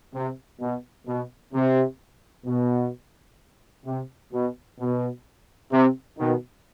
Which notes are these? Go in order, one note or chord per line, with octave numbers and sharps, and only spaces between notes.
C3
B2
B2
C3
B2
C3
B2
B2
C3
B2 D#3